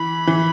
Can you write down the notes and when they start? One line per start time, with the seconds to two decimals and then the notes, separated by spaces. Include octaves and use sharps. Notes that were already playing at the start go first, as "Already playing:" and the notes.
Already playing: E3 B5
0.27 E3